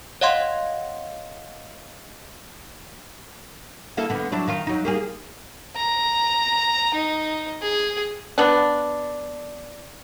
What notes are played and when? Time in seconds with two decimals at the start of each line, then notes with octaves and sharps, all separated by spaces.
0.21 C#5 D#5 F5 F#5 C6 G#6
3.97 A#3 E4 A4
4.10 D3 B3
4.32 F#3 D4 E4
4.48 D#3 F4
4.67 F#3 D#4
4.85 A#3 G4 G#4
5.76 A#5
6.94 D#4
7.62 G#4
8.38 B3 D4